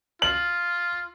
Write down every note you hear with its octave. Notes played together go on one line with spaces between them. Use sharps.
F4 F#7